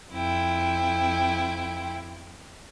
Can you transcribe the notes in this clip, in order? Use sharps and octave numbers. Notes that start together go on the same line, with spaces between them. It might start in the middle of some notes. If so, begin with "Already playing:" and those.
F2 E4 G5